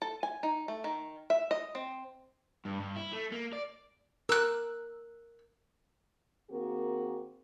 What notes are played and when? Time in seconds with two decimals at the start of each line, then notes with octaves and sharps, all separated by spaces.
0.02 A4
0.23 G#5
0.43 D#4
0.68 A3
0.84 D#3
1.30 E5
1.51 D#5
1.75 C4
2.65 G2
2.80 G2
2.96 E4
3.13 A3
3.32 A#3
3.53 D5
4.29 A#4 E6 F#6
6.50 D#3 A#3 C4 F#4 G#4 A#4